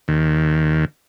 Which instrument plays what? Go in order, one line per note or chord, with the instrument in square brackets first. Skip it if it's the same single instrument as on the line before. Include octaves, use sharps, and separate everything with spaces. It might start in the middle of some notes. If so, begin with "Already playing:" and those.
[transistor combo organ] D#2